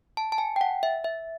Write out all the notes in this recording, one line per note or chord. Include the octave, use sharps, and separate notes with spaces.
A5
A5
G#5
G5
F#5
E5
E5